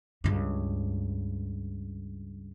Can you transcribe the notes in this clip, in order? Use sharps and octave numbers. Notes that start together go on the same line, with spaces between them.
C#2 G2